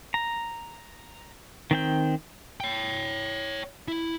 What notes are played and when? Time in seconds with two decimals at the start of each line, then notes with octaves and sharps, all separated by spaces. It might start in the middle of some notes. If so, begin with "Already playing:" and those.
0.14 A#5
1.71 D#3 C4 G5
2.60 C#5 G5
3.88 E4